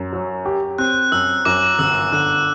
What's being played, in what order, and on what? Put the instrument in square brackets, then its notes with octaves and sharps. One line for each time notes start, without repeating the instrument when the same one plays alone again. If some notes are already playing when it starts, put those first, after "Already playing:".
Already playing: [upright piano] F#2
F#3
G4
[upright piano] C4 [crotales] F#6
[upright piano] F#2 [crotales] E6
[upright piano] F#2 [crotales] D6
[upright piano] G1 [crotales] E6
[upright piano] D3 [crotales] F#6